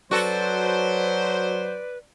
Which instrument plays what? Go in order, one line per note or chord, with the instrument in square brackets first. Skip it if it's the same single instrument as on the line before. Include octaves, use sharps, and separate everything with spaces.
[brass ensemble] F#3 C5 [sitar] F#4 A4 [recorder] B4 [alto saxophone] D5